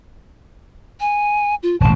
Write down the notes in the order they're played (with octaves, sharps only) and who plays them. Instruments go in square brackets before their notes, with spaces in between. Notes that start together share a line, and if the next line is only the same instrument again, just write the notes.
[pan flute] G#5
F4
[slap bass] E1 A1 [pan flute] A5